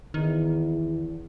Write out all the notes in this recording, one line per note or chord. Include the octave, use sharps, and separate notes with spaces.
E2 D#3